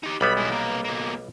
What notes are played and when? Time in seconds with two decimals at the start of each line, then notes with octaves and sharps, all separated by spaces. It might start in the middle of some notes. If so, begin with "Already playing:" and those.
0.03 D#4 G4
0.21 B1 G3 B3 B5
0.37 G#3 E4
0.49 C2 A#3
0.84 B2 A#3